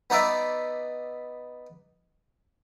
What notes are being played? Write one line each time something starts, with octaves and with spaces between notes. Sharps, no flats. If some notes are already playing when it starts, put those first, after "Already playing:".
B3 D#4 D5 E5